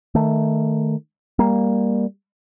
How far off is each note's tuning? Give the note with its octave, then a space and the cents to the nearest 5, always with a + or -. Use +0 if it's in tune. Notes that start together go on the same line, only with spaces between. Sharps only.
D#3 +0 A3 +10
G3 +20 A#3 +5